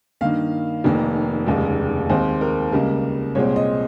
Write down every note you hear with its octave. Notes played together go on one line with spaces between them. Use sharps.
G2 D#3 A#3 F5
F1 F2 D#3 A#3
F1 D#2 C#3 G#3
D#2 D#3 G#3 C4 C5
A#4
C#2 C#3 G3 A#3 A#4
C2 A#2 G#3 C4 C#5
D#5